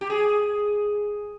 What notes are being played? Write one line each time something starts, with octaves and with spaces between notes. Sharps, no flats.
G4
G#4